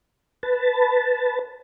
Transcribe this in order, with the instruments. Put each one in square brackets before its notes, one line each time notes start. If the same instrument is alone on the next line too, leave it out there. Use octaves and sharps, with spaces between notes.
[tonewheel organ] B4 A5